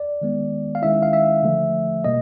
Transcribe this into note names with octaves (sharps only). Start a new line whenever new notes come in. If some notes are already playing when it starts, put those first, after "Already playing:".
Already playing: D5
D#3 G#3 B3
F5
D#3 G#3 C#4 E4 E5
F5
E5
D3 F3 A3
B2 G3 A#3 D#5